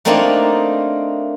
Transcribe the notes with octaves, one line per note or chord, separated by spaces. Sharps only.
A3 A#3 C4 D4 D#4 F4